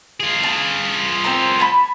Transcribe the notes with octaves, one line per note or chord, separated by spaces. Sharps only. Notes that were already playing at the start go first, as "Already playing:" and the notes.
F4 G#4
A5
C4 A#4
G#5 A5 B5